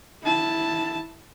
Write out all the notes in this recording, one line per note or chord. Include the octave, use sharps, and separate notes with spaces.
E4 A5